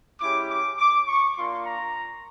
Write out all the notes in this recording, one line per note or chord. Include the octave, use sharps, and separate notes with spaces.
G#3 C#4 E4 G4 D6
D6
D6
C#6
A#3 D4 F4 C6
A#5